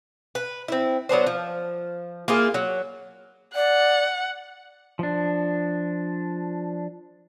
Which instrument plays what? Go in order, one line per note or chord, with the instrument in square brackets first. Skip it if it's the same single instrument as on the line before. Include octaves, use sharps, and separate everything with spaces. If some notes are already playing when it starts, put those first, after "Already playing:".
[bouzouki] B4
C4 E4
F#3 B3 D4 C5
F3
A#3 E4 F4 G#4
F#3
[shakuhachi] D5 [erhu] F#5
[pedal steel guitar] F3 D4